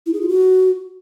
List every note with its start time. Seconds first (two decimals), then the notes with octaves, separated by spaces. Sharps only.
0.06 E4
0.14 G#4
0.21 F4
0.28 F#4